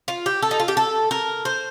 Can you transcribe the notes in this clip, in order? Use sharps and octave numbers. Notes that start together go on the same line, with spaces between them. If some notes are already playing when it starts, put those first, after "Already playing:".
F4
G4
A4
D#4
F4
G4
A4
A#4
C5